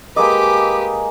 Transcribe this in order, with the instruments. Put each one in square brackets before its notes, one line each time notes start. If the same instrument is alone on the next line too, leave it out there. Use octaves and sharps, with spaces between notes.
[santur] G#3 A#3 D#5 [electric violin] G4 B4 [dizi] D6